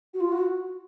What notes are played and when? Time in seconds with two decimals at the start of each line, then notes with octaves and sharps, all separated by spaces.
0.14 F#4
0.20 F4
0.32 F#4